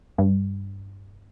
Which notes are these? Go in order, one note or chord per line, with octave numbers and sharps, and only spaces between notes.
G2